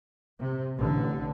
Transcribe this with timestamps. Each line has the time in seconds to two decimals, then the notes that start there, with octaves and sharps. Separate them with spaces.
0.39 C3
0.77 A1 D3